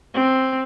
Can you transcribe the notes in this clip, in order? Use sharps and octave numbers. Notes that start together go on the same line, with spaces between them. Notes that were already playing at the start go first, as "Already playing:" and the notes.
C4